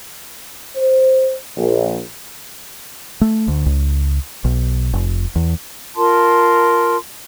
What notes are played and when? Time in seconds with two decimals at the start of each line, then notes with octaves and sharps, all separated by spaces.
0.76 C5
1.57 A#1
3.21 A3
3.48 D2
3.66 C#2
4.45 B1
4.93 F1
5.36 E2
5.95 F4 A#4 A5 C6